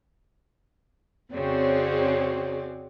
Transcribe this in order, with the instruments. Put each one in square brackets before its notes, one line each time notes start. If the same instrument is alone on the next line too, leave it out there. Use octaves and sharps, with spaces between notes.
[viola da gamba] F2 C#4 D5 [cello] C#3 [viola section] C4 F#4 G#4 [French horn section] C#5